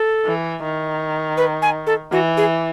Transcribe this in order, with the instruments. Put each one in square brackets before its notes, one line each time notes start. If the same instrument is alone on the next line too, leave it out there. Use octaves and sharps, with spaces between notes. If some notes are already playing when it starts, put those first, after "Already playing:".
Already playing: [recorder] A4
[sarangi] E3
D#3
[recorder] B4
G#5
A4
[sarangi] E3 [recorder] F#4
[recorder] G#4